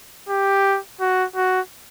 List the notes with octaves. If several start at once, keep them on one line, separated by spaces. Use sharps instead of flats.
G4
F#4
F#4